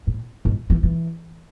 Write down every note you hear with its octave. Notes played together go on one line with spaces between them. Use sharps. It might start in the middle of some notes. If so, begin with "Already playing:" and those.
A2
G#2
E3
E3